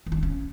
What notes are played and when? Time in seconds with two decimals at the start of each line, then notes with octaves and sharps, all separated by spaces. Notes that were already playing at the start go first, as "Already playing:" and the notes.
0.06 D#3
0.12 E4
0.17 D4
0.23 C#4